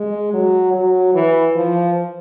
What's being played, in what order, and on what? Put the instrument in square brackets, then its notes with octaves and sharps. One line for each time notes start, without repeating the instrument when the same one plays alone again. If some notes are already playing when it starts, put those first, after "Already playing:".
Already playing: [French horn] G#3
F#3
F#3
E3
F3